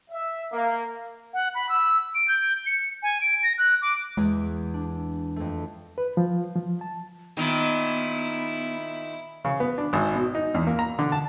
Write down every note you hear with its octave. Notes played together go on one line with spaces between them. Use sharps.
E5
A#3
F#5
B5
E6
D7
G6
C#7
G#5
D7
A#6
F#6
D6
E2 G#3 G#4
D4
F2 A3
B4
F3
F3
A5
A#2 D#3 B3 E4
C#3
B3
D4
G#1
B2
D#4
E2
A#3
A#5
D3
A5